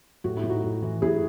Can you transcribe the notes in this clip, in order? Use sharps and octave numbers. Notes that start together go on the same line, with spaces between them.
A2 F#4
E4
A2
D#4 F#4
A2
E3
A2 E4 G#4